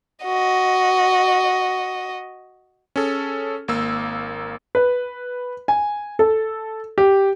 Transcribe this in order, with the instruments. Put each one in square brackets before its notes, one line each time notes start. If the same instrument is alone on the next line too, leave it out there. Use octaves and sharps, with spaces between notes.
[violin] F#4 D#5
[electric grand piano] C#4 G#4 A4
G#1 A#3 E6
[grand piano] B4
G#5
A4
G4